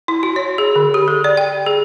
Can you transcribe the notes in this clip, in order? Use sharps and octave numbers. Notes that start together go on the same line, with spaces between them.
E4
F#4
C#5
G#4
D3
G4
A4
D5
G5
G#4